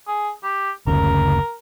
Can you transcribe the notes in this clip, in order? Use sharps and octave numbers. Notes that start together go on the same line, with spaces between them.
G#4
G4
F#1 D2 C#3 A#4